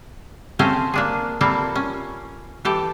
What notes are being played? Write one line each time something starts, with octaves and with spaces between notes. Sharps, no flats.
A3 C4 C#4 G#4 C5 F5
A#3 D4 G#4
G3 A#3 C4 E4 F4 A4
C#4
E3 G4 A4